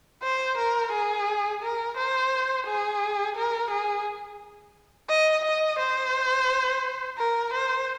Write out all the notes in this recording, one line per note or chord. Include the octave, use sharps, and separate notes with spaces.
C5
A#4
G#4
A#4
C5
G#4
A#4
G#4
D#5
D#5
C5
A#4
C5